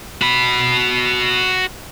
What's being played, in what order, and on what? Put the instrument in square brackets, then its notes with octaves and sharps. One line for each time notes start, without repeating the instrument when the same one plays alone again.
[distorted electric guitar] F#4 B5